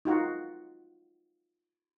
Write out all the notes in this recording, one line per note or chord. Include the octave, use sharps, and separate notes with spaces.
D#4 F4 F#4